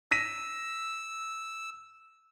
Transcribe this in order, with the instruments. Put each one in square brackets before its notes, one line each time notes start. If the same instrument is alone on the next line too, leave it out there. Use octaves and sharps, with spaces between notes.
[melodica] E6 [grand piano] A#6 B6 D#7